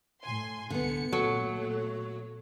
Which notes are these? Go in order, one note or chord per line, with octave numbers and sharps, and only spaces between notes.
A2 G#5 C6
C2 D3 B3 C#7
A#2 F#3 A3 A4